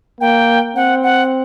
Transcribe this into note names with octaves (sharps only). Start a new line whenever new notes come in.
A#3 G5
C4 F#5
F#5